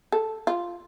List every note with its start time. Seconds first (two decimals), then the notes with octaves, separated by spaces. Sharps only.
0.12 A4
0.47 F4